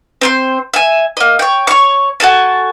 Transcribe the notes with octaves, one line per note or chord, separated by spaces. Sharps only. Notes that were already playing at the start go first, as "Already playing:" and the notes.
C4 C5 C6
E5 G#5
A#3 D#5
C#5 G5
C#5 C#6
F#4 A4 G#5 A5